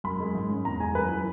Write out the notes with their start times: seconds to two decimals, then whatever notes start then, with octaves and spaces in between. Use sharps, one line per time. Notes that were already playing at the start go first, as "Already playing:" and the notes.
0.04 F#2 B5
0.20 G#3
0.35 G#2
0.50 C#4
0.65 E2 A#5
0.80 G#3 G#5
0.95 F#2 B4
1.11 E3